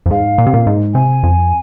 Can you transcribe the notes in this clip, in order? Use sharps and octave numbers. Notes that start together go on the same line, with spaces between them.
F2
G#2 F5
A#2
C3
A#2
G#2
C3 G#5
F2